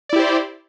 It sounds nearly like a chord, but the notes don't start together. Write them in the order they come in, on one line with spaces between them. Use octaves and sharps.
D5 E4 G4 C5